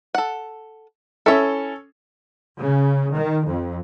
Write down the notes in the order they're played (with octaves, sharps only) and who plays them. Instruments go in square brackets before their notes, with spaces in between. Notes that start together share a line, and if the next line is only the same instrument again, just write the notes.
[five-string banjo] A4 F#5
[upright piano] C#4 A4 [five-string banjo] E4 E5
[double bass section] C#3
D#3
F2